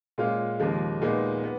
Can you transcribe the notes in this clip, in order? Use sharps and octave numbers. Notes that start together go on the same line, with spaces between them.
A#2 G#3 C#4 F4
D#2 C#3 F3 G#3
A#2 G#3 B3 D#4
B3